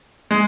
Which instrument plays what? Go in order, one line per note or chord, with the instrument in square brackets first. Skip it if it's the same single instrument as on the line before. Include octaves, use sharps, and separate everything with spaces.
[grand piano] G#3